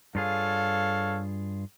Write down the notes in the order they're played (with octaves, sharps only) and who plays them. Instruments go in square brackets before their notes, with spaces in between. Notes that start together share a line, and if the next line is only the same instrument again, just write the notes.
[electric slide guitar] G2 F4 G#4 [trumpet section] A4 C#5 F5